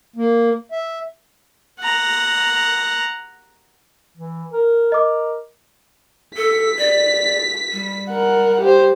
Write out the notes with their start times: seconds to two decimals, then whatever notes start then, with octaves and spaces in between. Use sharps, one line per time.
0.16 A#3
0.72 E5
1.81 F#5 A#5
4.17 E3
4.52 A#4
4.92 A#4 D#5 D6
6.37 A4 B6
6.79 D5
7.73 G3
8.10 A#4 F#5
8.61 G4 C5